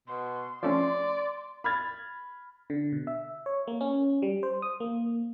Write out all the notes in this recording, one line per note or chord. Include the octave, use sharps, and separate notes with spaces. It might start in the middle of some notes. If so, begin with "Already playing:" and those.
B2 C6
F3 A3 C#4 D5
B5 F6 G#6 A6
D3
B2
E5
C#5
A#3
C#4
G3
C5
D#6
A#3